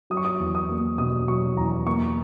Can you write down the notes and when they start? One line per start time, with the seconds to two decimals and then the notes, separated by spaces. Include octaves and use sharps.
0.10 F#3 D#6
0.17 C#6
0.25 D#6
0.40 E2
0.55 D#6
0.69 A#3
0.98 B2 D#6
1.28 F#3 C#6
1.57 E2 A#5
1.86 A#3 C#6